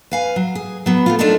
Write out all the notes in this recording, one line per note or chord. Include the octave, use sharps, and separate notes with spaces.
B4 F5 G#5
F#3
G#4
F#3 B3
A3 A#3 F4
A3 D4 D#4 F4 A4 A#4